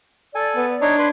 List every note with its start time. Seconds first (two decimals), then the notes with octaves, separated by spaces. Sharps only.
0.35 A4 D5 G#5
0.57 B3
0.81 D4 D#4 C#5 G#6
0.99 B4 C6